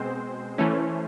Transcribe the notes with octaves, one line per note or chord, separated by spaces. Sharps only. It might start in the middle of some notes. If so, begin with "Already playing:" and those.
Already playing: B2 G#3 C4 C5
E3 A3 C#4